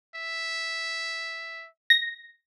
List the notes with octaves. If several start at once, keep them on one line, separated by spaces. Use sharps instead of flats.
E5
A#6